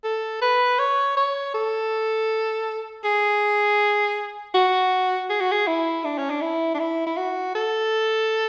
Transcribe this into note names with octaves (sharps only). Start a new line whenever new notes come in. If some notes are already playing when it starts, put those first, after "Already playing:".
A4
B4
C#5
C#5
A4
G#4
F#4
G#4
F#4
G#4
E4
D4
C#4
D4
E4
D4
E4
E4
F#4
A4